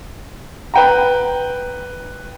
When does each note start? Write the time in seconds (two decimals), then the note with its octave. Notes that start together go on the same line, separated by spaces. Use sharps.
0.74 B4 G5 A#5